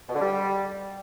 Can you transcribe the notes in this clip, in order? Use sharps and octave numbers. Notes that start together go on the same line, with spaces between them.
B2
D3
G3